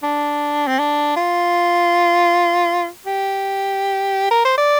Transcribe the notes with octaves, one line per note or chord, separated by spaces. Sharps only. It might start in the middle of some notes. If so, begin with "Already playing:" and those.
D4
C4
D4
F4
G4
A#4
C5
D5